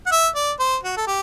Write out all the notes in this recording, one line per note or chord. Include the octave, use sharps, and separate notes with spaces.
F#5
E5
D5
C5
F#4
A4
G4